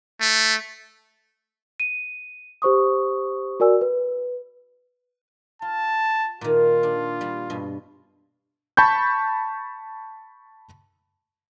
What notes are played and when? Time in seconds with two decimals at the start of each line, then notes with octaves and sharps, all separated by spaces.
0.20 A3
1.80 D#7
2.62 G4 C5 C#6 D#6
3.60 F#4 A#4 D5 G#5 E6
3.81 B4
5.62 F4 A5
6.41 A#2 D#3 F4
6.83 D4
7.21 G3
7.50 G2 B2
8.77 A5 B5 C#6 G6